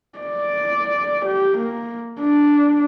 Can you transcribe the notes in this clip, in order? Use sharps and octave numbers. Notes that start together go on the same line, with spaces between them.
D5
G4
A#3
D4